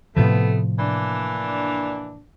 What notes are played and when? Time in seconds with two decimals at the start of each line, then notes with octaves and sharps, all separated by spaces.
0.16 A2 C3 F3 A3 B3
0.79 E3 A#3 D4